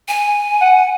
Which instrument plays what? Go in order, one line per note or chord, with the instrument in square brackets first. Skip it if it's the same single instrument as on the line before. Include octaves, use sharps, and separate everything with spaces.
[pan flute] G#5
[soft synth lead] F#5